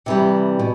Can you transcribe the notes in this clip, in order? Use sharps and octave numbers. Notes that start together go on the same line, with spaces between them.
C3 E3 G3
B2